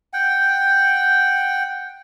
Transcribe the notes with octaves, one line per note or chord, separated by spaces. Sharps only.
F#5 G5